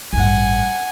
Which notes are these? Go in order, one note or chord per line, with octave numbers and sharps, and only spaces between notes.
A1 G2 F#5 G#5